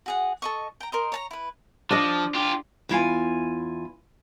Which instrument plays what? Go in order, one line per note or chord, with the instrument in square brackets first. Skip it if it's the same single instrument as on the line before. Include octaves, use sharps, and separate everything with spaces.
[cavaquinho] F#4 G#4 F#5
A4 D#5 C#6
G5 A#5
A#4 C5 D#5
C#5 A5 A#5
E4 B4
[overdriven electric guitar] F3 [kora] D4 D#5
[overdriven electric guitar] F4 G4
[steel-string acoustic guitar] E2 E4 F4 G#5